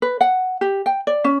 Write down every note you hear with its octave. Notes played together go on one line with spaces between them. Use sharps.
B4
F#5
G4
G5
D5
C#4